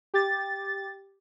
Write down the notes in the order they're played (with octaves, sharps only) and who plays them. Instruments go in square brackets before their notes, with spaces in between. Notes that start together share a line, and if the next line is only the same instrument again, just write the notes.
[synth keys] G4 A6